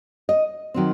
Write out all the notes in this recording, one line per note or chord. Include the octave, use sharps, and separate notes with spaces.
D#5
D#3 F#3 C4